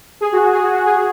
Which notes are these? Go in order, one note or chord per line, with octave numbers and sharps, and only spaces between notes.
G#4
F#4
F#4
G#4
F#4
F#4
G#4
G#4